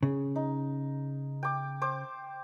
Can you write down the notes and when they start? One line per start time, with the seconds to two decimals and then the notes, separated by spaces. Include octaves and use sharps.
0.03 C#3
0.36 D#4
1.43 G5 D6
1.82 C5 D6